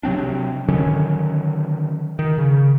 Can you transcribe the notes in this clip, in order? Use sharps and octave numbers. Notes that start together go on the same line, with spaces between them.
C3 F#3 C4 D4
D3 D#3 F#3 C#4
D#3
C#3